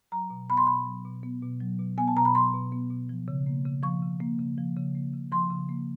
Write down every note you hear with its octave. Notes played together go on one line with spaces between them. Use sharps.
F#3 A#5
B2
B3 B5
C6
B2 B5
F#3
B2
B3
B2
F#3
B2
B3 G#5
A5
B2 A#5
B5
F#3 C6
B2
B3
B2
F3
C#3
A#3
C#3
F3 C#6
C#3
A#3
C#3
F3
C#3
A#3
C#3
F3 C6
C#3
A#3